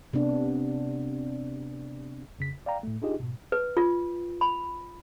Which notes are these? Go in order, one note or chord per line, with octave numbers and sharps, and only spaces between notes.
C3 B3 D4
F2 C#3 B6
A1
D5 F5 G5 A#5
A2 A3
D4 D#4 F4 G4 G#4 D#5
G#2 B2
B4
F4
B5